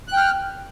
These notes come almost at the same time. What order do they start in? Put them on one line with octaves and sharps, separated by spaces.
F#6 G5 F6